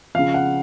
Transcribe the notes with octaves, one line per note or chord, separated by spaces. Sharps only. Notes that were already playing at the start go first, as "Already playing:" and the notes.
C#3 F3 F5
F#5